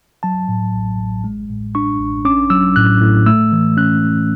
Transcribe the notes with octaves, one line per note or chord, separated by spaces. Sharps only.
F#3 A5
A2
A1
A1
G#3
A2
D4 C#6
A1
C#4 D6
F#3 E6
A2 F#6
A2
A3 E6
E3
C#4 F#6